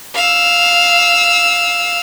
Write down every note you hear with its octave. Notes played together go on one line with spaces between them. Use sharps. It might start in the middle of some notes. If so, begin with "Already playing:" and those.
F5 E6